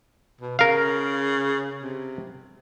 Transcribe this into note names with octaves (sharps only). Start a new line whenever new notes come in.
B2
C#3 A#4 F5
C3